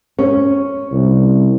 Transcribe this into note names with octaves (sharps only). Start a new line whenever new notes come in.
C#4
C2